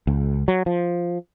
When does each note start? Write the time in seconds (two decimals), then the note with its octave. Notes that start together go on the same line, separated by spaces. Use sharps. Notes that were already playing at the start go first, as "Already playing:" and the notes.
0.07 C#2
0.48 F#3
0.66 F3